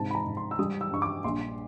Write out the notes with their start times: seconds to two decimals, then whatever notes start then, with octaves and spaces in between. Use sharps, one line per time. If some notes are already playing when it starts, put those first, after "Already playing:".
Already playing: G#2 C3 A5
0.11 B5
0.15 A#5
0.25 G#2
0.37 C6
0.51 E6
0.59 G3 D#6
0.81 E6
0.91 G2 C#6
1.02 D6
1.24 A#1 C6